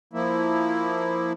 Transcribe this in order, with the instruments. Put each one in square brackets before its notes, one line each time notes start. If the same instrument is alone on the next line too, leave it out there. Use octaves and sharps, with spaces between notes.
[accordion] F3 A#3 E4